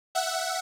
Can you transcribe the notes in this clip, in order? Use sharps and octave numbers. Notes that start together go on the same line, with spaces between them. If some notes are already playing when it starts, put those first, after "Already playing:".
E5 F#5